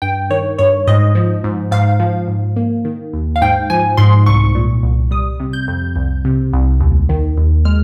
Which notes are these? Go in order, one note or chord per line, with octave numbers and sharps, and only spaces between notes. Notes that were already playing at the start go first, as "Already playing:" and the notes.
G2 G5
D#3 C#5
G2 C#5
G#2 D#5
F3
G#2
G#2 F5
F3
G#2
A#3
D#3
D#2
F5
G#2 G5
F3 G#5
G#2 C6
C2 C#6
A#2
C2
G3 D#6
C3
G6
F2
C2
C3
C2
D#2
D#3
D#2
G#3 F6